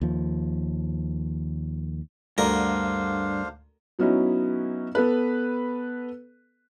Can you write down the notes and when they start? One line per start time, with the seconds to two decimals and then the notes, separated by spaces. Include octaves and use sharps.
0.02 D#2 F3
2.38 D2 G2 D4 A#4 C5 F5
3.99 F#3 B3 C#4 D#4 E4 F#4
4.95 B3 A4 B4